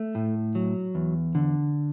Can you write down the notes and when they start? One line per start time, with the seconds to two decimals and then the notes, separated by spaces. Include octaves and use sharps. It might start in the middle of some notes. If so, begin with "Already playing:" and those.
Already playing: A3
0.15 A2
0.55 F#3
0.95 E2
1.35 D3